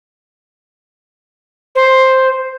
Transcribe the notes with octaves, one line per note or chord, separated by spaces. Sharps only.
C5